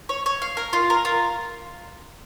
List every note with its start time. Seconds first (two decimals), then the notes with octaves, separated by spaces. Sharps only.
0.09 C#5
0.26 C#5
0.42 F5
0.57 A#4
0.73 F4
0.90 A#4
1.05 F4